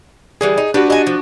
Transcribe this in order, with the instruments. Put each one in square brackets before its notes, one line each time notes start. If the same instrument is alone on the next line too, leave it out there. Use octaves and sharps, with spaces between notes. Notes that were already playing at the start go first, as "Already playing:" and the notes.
[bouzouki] D3 E3 G3 [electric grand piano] G#4
[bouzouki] D#4
[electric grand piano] D4 F#4 [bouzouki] G4 B4
[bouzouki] D#5 G#5
F3